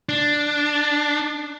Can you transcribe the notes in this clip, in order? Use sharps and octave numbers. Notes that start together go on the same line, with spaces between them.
D4